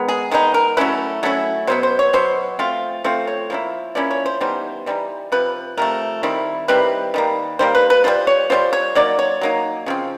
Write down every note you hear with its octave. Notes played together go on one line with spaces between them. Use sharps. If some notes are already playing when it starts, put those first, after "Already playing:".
Already playing: D#3 G#3 B3 D#4
G#4
D#3 G#3 B3 D#4
A#4
F#3 A3 C#4 E4 B4
F#3 A3 C#4 E4
B2 F#3 B3 C5
C5
C#5
B2 F#3 B3 C5
F3 A3 C4 F4
F3 A3 C4 F4 C5
C#5
F3 A#3 C#4 E4
F3 A#3 C#4 E4 D5
C#5
C5
E3 G3 B3 D#4 C5
E3 G3 B3 D#4
C3 F3 B4
C3 F3 A3 A#4
D#3 G3 C4 E4
D#3 G3 C4 E4 B4
D#3 G3 A#3
D#3 G3 A#3 C5
B4
B4
G3 C4 F4 C5
C#5
G3 C4 F4 C5
C#5
F#3 A#3 D#4 D5
C#5
F#3 A#3 D#4
C#3 F3 C4